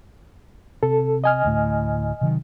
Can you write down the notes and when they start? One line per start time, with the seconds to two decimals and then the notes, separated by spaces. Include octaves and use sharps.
0.83 C3 A4
1.24 D#5 G#5 F6
1.44 D2 A2
2.21 C3 D#3 F#3